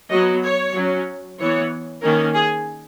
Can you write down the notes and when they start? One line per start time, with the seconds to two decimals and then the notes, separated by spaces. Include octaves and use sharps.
0.10 F#3 B3 D#5
0.43 C#5
0.75 F#3 C#4
1.38 E3 B3 C#5
2.02 D#3 A#3 C#4 A#4
2.34 G#4